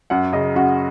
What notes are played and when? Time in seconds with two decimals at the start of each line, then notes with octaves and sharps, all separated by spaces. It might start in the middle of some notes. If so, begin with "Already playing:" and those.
0.10 F#2 F#5
0.33 C#3 D#5
0.55 F#2 F#4